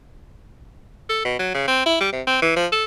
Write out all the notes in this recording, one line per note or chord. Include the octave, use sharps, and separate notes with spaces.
A4
B2
F#3
C#3
C4
E4
G3
C3
C4
E3
F3
A4